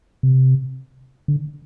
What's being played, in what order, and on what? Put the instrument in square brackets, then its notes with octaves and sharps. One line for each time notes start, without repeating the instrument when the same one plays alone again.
[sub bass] C3
D3